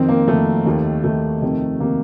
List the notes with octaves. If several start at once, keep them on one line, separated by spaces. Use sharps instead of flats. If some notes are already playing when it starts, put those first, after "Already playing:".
Already playing: F2 D#3 C4
A#3
F2 D#3 A3
D#2 D#3
D#2 D#3 A3
F2 C3 D#3
C3 D#3 A#3